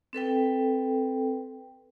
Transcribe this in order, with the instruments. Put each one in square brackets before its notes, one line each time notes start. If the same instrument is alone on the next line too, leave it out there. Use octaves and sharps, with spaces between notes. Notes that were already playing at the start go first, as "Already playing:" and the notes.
[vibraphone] C4 A4 B4 G5